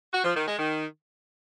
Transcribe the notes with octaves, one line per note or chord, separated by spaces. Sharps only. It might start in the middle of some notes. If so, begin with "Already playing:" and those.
F#4
F3
D#3
G#3
D#3